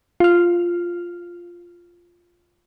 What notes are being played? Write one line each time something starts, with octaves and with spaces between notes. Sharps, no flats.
F4 F6